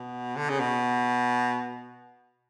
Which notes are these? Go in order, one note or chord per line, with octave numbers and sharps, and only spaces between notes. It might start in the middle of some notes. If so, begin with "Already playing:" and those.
Already playing: B2
D3
C#3
B2